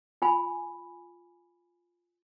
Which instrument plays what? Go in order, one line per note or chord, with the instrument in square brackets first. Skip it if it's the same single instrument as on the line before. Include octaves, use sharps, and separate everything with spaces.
[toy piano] F4 G#5 B5